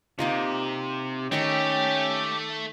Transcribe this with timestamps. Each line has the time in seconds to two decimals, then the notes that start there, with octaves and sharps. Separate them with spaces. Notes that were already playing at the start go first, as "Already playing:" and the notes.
0.19 C3 A#3 D#4 F4
1.32 D#3 A3 C#4 G4 D#5 C#6